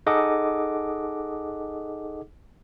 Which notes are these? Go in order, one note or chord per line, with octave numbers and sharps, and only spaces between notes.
D#4 G#4 A4 D#5 F#5 D6